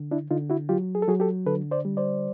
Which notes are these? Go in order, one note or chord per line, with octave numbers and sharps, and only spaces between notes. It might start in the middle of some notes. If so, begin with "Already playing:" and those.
Already playing: D3
D4 E4
D3 D#4 F4
E4 F#4
F#3 F4 G4
G#4
A4
F#3 F#4 G#4
G4 A4
D3 A4 B4
C5 D5
G3
C5 D5